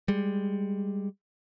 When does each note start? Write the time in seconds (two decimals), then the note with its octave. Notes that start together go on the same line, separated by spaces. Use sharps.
0.08 G3 G#3